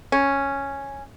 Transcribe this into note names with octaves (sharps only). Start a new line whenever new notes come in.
C#4